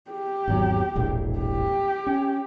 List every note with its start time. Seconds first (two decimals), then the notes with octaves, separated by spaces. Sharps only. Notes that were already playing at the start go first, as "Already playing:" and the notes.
0.11 G4
0.48 G#1 E2 F#3
0.95 E1 A#1 A2
1.39 G4
2.07 C#4